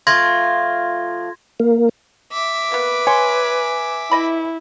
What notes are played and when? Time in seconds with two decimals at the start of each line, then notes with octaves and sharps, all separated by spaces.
0.07 F3 A3 F4 C6 G#6 A#6
1.60 A#3
2.32 E5 D6
2.72 A#3 B3 B4
3.07 C#5 G#5 C6
4.11 E3 E4 D#5 B5